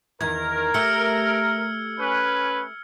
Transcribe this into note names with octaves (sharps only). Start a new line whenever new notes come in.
E2 D#3 A#4 G#6
A3 G4 E6 F6 C#7
C#4 B4